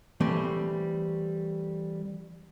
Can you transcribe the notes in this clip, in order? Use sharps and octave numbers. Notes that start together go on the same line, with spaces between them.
E3 G3 A3 C4